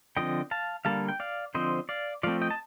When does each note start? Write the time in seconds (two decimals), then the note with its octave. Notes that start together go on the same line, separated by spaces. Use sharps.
0.17 D3 F3 C4 D#5 G5
0.51 F5 A5
0.85 D3 G3 A#3 F5 A5
1.08 G5
1.20 D5 F5
1.55 D3 F3 C4 C5 D#5
1.89 D5 F5
2.23 F3 A3 C4 D5 F5
2.41 D#5 G5
2.51 A5